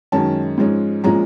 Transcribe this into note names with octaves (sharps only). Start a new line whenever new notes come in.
F#2 D#3 G#3 C#4 A5
G#2 F3 G#3 C#4
A#2 F3 G#3 C#4 A#5